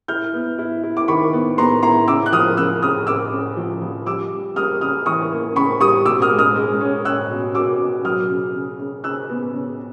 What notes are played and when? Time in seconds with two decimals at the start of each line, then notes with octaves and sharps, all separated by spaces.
0.08 E4 F6 G6
0.34 B3
0.59 E4
0.83 E4
0.97 D6
1.08 D#3 B5 C#6
1.33 B3
1.58 B3 A#5 C6
1.82 E4 A#5 C6
2.08 C#3 D6 E6
2.26 F#6
2.32 F3 D#6 F6
2.57 C#3 E6 F#6
2.82 C#3 D#6 F6
3.07 C#3 D6 E6
3.32 C#3
3.57 F3
3.82 F3
4.06 G3 D6 E6
4.32 G3
4.56 G3 D#6 F6
4.81 C#3 D#6 F6
5.06 E3 C#6 D#6
5.31 A#3
5.56 C#3 B5 C#6
5.81 G3 C#6 D#6
6.06 B2 D6 E6
6.22 D#6 F6
6.30 G#3
6.39 D#6 F6
6.56 G#3
6.80 C#4
7.05 C#4 E6 F#6
7.30 B2
7.54 B2 D6 E6
7.80 B2
8.05 F#3 D#6 F6
8.30 C#3
8.54 C#3
8.80 C#3
9.04 C#3 E6 F#6
9.29 B3
9.54 C#3